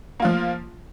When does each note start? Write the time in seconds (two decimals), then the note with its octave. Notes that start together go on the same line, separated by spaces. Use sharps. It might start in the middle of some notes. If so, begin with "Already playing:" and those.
0.20 A#3
0.22 F4
0.25 F3